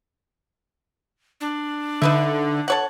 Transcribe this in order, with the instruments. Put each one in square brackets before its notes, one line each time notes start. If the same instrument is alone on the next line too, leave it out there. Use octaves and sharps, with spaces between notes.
[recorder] D4
[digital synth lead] D3 [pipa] D#4 B4 E5
[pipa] A4 C#5 F#5